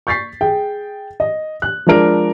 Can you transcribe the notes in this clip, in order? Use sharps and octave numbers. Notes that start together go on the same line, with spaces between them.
C#6 G6 A6 B6 C7
G#4 G5
D#5
F#6
F3 G#3 D4 A#4 D7